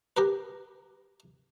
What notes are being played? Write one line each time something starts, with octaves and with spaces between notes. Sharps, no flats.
G4 A#4 B4